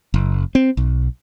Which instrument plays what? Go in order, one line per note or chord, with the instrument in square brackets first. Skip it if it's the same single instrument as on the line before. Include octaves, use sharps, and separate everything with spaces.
[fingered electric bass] F#1
C4
B1